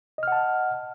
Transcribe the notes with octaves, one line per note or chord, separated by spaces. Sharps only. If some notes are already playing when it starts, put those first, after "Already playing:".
D#5 F#5 A5 F6